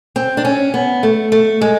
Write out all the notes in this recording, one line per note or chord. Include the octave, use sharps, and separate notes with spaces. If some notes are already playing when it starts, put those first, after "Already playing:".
C4
D4
C#4
B3
A3
A3
G#3